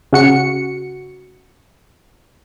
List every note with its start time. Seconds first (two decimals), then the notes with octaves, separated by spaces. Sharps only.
0.13 C#3 F#4 C#7